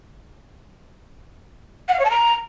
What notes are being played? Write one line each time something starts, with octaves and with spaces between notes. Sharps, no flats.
F#5
F5
C#5
A5
A#5